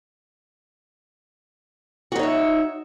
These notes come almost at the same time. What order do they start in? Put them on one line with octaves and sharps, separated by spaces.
F#4 D#4 C#5 E5